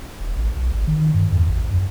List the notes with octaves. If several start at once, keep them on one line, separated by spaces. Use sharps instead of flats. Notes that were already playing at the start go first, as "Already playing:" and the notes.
D#1
A1
B1
G#1
D#3
G2
E2
A1
F#2